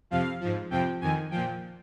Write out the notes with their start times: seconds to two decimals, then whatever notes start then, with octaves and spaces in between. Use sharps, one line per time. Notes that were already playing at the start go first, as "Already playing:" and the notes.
0.10 F2 C3 F3 F5
0.41 G#2 F3
0.70 F2 C3 F3 G5
1.01 F2 D#3 G#5
1.31 A#2 F3 G5